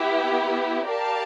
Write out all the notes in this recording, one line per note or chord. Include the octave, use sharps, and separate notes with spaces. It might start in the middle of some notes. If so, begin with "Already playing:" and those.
Already playing: B3 E4 G4
G4 A#4 D5 F5 A5